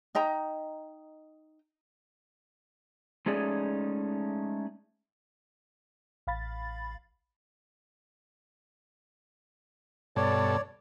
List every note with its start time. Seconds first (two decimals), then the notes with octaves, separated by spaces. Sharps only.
0.15 D#4 D#5 G5 A#5
3.26 G#3 A3 C#4 D#4 G#4 D5
6.27 A1 F5 B5 A6
10.16 G2 B2 A4 C#5 D5